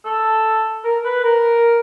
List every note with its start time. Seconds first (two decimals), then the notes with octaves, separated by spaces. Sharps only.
0.05 A4
0.84 A#4
1.05 B4
1.23 A#4